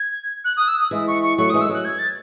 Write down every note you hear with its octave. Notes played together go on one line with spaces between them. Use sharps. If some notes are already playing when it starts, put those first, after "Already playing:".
Already playing: G#6
F#6
D#6
E6
D#6
E3 G#3
C#6
C#6
F#3 A3 C#6
D#6
E3 G#3
E6
F#3 F#6
G#6
A6